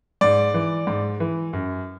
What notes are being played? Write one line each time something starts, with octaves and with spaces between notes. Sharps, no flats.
G#2 D5
E3
G#2
E3
F#2